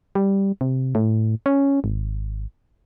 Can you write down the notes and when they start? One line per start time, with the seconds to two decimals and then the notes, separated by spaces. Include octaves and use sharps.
0.15 G3
0.61 C3
0.95 A2
1.46 C#4
1.84 G#1